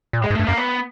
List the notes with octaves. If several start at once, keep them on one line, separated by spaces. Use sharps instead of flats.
A#2
A2
G#3
G#2
G2 A3
F#2 A#3
B3